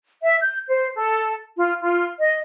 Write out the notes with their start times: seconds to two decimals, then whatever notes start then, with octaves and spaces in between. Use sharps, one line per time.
0.22 E5
0.41 G6
0.67 C5
0.96 A4
1.57 F4
1.81 F4
2.19 D#5